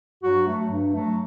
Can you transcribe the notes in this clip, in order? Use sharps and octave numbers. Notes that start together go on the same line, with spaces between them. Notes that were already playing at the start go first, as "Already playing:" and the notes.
G2 F#3 F#4
F#3 A3
G2
F#3 A3